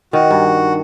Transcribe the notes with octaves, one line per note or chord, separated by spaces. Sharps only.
D#3 F#4
G2